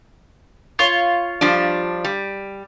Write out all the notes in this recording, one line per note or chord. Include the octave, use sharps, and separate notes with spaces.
F4 C#5
F3 G3 D4
G3